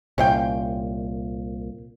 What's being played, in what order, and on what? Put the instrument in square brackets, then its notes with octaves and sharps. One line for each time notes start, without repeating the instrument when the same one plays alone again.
[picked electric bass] C2 A#2 [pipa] C#4 C5 G5